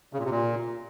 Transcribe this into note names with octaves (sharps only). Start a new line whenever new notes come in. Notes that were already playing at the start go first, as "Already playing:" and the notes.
C#3
A#2
C3
A#2